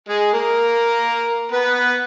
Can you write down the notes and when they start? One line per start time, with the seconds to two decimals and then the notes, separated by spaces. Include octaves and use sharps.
0.09 G#3 G#4
0.33 A#3 A#4
1.52 B3 B4